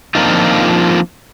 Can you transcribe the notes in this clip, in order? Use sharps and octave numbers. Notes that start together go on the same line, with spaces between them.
F3 A#3 C4 D4 D#4 F4